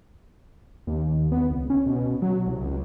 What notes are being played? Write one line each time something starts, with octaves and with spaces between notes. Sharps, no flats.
D#2
B3
C#2
C#4
B2
F#3
C2
C#2